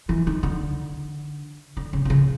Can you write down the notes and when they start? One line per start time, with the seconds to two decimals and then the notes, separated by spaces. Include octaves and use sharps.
0.09 E3
0.27 D#3
0.43 D3
1.77 D3
1.93 C#3
2.05 C3
2.10 C#3